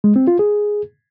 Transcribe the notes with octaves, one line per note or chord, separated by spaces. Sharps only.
G#3
C4
F4
G#4